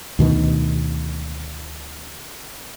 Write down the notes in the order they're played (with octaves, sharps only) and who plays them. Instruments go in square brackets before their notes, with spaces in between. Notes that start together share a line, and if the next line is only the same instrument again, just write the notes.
[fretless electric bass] D2 B2 D#3